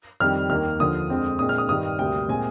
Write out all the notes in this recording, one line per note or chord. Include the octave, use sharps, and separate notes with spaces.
F2 D#3 G3 F6
D#2 D#3 A#3 F6
D#2 D3 F3 D#6
F2 D3 G#3 C4
A#2 G#3 C4 D#6
F6
D#6
G2 D#3 G3 D#6
D2 C3 G3 A#3 G5
A#2 G#3 C4 G#5